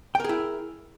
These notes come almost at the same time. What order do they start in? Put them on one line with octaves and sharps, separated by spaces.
G5 A#4 G#4 E4